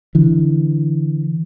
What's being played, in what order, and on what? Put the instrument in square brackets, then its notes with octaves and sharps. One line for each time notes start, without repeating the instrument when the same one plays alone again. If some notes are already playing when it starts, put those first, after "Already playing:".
[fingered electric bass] D3 E3